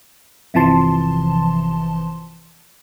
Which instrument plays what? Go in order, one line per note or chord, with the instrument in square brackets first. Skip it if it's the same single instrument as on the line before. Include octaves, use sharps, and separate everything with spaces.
[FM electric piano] G1 C3 E3 F3 A5 C6